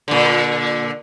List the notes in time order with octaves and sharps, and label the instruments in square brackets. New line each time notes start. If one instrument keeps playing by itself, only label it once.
[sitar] A#2 D3